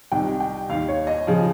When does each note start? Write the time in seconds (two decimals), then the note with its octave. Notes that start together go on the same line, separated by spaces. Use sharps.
0.12 C2 C3 D#3 G5
0.40 G5
0.69 D#2 D#3 F5
0.88 C#5
1.07 D#5
1.27 C#3 F3